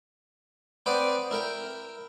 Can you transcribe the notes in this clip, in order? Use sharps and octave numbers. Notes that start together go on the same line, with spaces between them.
C4 B4 C5 D5 F#5 D#6
E4 A#4 G5